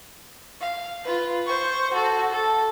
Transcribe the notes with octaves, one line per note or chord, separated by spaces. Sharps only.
F5
F4 B4
C5 C#6
F#4 A4
A4